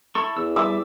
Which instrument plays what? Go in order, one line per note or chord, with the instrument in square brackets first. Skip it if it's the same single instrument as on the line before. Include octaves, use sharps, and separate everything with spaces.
[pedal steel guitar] E4 A4 C#6
[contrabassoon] E2 [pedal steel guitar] E6
[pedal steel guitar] G3 E5 D6 [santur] E6